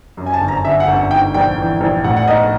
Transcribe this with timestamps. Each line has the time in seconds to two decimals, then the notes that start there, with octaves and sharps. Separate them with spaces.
0.17 F#2
0.26 G#5
0.33 A5
0.41 G1
0.48 A#5
0.64 D3 E5
0.80 F#5
0.87 G1
0.96 F#5
1.11 G#2 G5
1.34 A#1 G5
1.57 E3
1.81 A#1
2.04 A2 F#5
2.16 F#5
2.28 B1 D#5